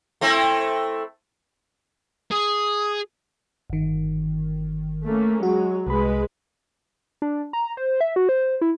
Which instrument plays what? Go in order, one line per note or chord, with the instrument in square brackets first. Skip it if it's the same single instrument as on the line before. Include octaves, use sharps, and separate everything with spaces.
[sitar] A3 C4 E4
[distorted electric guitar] G#4 [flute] D#6
[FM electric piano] G1 D#3
[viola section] A3 A#3 C#4
[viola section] F#3 G#3 [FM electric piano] F#4
[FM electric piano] C2 B5 [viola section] G#3 B4
[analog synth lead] D4
A#5
C5
E5
F#4
C5
E4